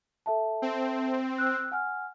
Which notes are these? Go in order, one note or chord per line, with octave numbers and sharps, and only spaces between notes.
A4 E5 A5
C4
E6 F#6
F#5 G#5 F6